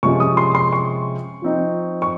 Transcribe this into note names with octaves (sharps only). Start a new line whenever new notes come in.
C3 F3 G#3 C#4 F4 C#6
D#6
C6
C6
C#6
F3 C4 D#4
C#6